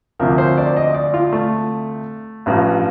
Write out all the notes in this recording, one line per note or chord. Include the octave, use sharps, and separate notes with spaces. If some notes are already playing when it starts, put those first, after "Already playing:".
D2 C3 F3 A#4
C5
D5
D#5
D5
F4
A3
A1 G2 F3